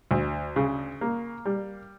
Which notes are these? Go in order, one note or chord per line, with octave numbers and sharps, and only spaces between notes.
D2
C#3
A#3
G3